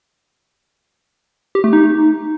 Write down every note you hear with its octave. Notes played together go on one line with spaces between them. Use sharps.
G4
A3
D#4